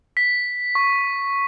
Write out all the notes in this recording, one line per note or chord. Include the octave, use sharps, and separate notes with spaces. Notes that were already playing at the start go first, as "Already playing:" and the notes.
B6
C#6